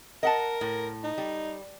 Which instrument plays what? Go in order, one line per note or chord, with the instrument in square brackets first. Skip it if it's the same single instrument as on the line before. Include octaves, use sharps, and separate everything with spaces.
[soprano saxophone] A#4 [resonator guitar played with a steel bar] D#5 F#5 A5
[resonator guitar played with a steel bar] A2
[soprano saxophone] D#4
[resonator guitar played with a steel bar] G3